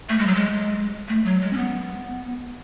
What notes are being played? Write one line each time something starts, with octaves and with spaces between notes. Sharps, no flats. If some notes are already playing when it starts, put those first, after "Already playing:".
A3
G#3
F#3
G#3
A3
F#3
G#3
C#4
B3